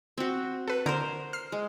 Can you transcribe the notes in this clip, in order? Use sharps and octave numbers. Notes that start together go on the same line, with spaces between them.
C4 F#4
A4 B4
D3 A#4 C5 G6
F6 C7
G#3